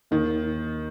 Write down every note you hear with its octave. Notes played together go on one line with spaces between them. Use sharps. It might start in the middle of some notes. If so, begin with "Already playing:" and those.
D#2 D#3